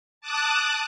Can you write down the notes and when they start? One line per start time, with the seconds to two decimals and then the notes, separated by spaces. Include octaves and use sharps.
0.21 A5 D6 D#6 F#6